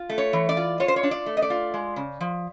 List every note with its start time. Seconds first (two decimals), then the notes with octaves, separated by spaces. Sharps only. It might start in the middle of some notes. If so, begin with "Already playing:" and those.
Already playing: F4
0.10 A3
0.18 C#5
0.33 E3
0.49 D5
0.57 F4
0.80 F4 C#5
0.88 C5
0.96 C#5
1.03 D4
1.11 D5
1.26 A3
1.37 D#5
1.42 D5
1.50 F4
1.74 G#3
1.96 C#3
2.21 F3